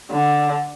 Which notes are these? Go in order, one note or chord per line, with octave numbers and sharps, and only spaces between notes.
D3